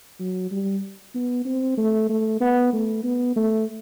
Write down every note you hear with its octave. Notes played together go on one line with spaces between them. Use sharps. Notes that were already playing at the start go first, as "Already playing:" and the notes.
F#3
G3
B3
C4
A3
A3
B3
A3
B3
A3